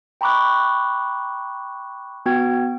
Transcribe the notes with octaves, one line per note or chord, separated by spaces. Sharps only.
G5 A#5 B5 C#6 D6 F#6
B3 F#4 G5 G#6